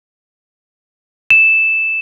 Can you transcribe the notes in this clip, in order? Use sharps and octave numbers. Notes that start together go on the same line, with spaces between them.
E7